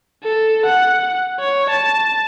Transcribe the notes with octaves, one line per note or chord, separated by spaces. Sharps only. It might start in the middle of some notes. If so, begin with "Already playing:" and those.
A4
F#5
C#5
A5